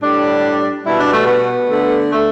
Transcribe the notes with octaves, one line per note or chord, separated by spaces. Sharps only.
A2 G3 D4
B2 G3 E4
D4
A3
B3
D3 A3
A3